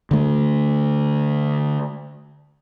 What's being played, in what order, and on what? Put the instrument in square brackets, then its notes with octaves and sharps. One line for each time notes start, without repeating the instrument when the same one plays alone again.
[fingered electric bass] D3 A3